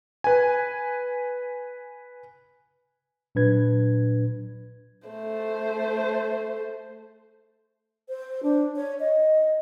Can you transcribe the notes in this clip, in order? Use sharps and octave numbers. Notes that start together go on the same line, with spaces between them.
B4 G#5
A#2 F#3 D4 B4 G#6
A3 C5
C5
D4
C#5
D#5